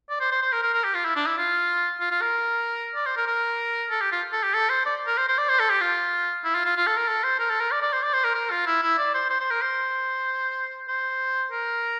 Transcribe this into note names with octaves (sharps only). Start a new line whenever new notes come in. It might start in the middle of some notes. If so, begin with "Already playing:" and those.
D5
C5
C5
C5
A#4
A#4
A#4
G4
F4
E4
D4
E4
F4
F4
F4
A#4
D5
C5
A#4
A#4
A4
G4
F4
A4
G4
A4
C5
D5
A#4
C5
C5
D5
C5
A4
G4
F4
E4
F4
F4
F4
A4
A#4
A4
C5
A#4
A4
A#4
D5
D5
C5
D5
C5
A#4
A#4
F4
E4
E4
D5
C5
C5
C5
A#4
C5
C5
A#4